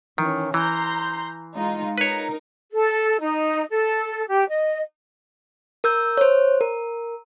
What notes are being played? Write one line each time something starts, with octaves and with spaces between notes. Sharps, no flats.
D#3 E3 C#4
E3 A#5 C6 G6
G#3 D#4 F4
D#4 A#4 B4 C#5
A4
D#4
A4
G4
D#5
A#4 E6 G6
C5 C#5
A#4